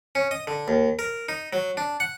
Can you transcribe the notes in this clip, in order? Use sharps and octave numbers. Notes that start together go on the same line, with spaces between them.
C#4
D#5
D3
D#2
A#4
D#4
F#3
D4
F#5